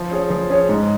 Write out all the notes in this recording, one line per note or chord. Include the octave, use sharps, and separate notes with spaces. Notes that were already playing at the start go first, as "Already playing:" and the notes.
Already playing: F3
C#4 G#4 C#5
F3
C#4 G#4 C#5
G#2